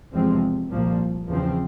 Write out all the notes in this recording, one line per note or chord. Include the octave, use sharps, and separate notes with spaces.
E2 C3 F3 G#3 C4
C2 A#2 F3 A#3
E2 C#3 F3 C4